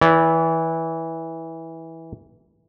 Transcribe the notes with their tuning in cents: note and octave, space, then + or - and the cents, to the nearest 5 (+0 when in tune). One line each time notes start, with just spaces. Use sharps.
E3 -15 D5 -40